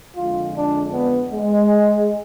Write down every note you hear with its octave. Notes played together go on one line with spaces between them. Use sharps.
F2 D3 G#3 F4
D4
B3
G#3